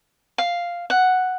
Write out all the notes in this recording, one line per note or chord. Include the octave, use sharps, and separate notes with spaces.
F5
F#5